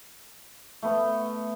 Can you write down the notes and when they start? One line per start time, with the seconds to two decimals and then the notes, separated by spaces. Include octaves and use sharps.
0.82 A3 B3